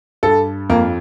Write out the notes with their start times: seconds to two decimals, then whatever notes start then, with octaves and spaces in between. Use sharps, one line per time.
0.23 G2 A4
0.70 F2 A#3